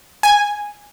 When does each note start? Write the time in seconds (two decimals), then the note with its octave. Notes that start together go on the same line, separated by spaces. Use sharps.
0.23 G#5